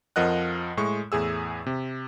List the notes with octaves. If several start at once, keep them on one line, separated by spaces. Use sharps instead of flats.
F2 F3 A#4 D#5 F#5 F#6
A2 G#3 C#6
E2 A2 G#4 E6
C3